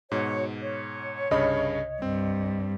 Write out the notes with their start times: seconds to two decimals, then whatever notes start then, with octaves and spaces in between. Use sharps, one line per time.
0.11 G#2 B2 F#4 C#5
0.61 C#5
1.31 C2 G2 C#3 D#5 B5
2.02 G2 C4